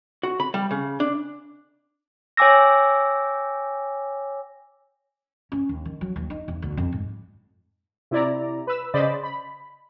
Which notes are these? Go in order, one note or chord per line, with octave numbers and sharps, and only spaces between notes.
F#4
B5
G3
C#3
D4
C#5 G5 G#5 D6 E6 A#6
C#4
D#2
D#3
F#3
D#2
D#4
E2
D2
F2
G#2
C3 E4 D5 A#5
B4 E6
C#3 C5 D5 D#5 B5 A6
B5